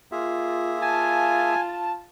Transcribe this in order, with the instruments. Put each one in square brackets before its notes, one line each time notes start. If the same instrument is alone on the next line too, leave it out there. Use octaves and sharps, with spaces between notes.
[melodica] A#3 G#4 E5 [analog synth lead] F4
[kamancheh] F4 [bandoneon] G#5 [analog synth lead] A5